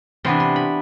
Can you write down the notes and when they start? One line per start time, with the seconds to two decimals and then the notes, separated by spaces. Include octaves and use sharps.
0.25 C3 E3 B3 D4 C6
0.40 C6
0.56 B5